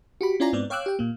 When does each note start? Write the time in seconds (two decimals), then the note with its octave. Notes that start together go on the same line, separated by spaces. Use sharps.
0.21 F#4 G4 B5
0.40 C#4 E4 F4 D5 G#5 A#5
0.53 G#2 B3 C4 D5
0.70 C#5 F5 G5 D6 E6 F#6
0.86 G4 G5
0.99 A#2 A#3